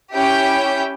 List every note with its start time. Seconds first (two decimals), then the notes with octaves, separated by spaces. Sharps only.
0.14 C#4 E4 G4 G5